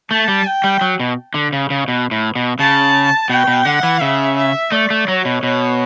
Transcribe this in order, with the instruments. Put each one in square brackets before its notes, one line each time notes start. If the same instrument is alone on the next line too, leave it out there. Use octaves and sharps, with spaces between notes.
[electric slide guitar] A3 [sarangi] A5
[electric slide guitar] G3
[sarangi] G5
[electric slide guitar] G3
F#3
B2
D3
C#3
C#3
B2
A2
B2
[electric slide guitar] C#3 [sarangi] A5
[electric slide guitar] B2 [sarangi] G5
[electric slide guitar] B2
[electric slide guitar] D3 [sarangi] F#5
[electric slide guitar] E3
[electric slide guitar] C#3 [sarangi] E5
[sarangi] E5
[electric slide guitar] A3 [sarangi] D5
[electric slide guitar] A3
[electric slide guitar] F#3 [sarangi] C#5
[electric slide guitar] B2
[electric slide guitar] B2 [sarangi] C#5